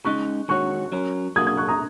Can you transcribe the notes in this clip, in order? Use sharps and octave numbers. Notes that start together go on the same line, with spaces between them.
C#2 C#3 G#3 D#4 C#6 F#6
D#3 G#3 F#4 C#5 C#6 F#6
F#3 C#4 A#4
F#3 A#3 F#4 D#6 G#6
D#6 G#6
C#6 F#6
A#5 D#6